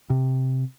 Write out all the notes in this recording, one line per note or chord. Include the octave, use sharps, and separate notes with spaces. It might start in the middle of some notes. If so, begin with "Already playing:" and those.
C3